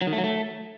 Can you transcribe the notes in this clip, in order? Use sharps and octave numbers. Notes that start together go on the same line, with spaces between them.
F#3
D#3
A3
F#3
A3